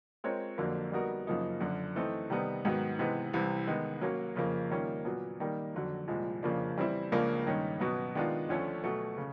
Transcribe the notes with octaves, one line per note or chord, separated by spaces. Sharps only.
G#3 C4 F4 A#4 C#5
F2 D3 F#3 A#3
G3 B3 D#4 F#4 A#4
F#2 C#3 F3 A#3 D#4
F#2 D3 F3
E3 A3 C4 D#4
C3 D#3 G3 B3 D#4
G#2 D#3 F#3 B3
C3 E3 G#3 B3
C2 C3 E3
D#3 G#3 B3
F#3 A#3 C#4
F2 C#3 F3 A#3
D#3 G3 A#3 C#4 F4
A#2 F#3 B3
D#3 G3 A#3
F2 D3 F#3
C2 A#2 F3 G#3
F2 C#3 F3 A#3 D4
E3 G3 C4 E4
C#2 C#3 F3 A#3 D4
G2 D#3 G#3 C#4
B2 F#3 B3
D#3 G#3 B3 D4 F4
D2 D3 F3 A3 C#4
B2 F#3 A3
C#3